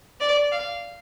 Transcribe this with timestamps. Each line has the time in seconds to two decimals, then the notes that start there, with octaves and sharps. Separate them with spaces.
0.20 D5
0.52 F5